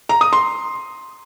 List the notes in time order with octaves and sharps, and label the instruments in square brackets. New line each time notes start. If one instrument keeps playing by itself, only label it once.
[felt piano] A#5
D#6
C6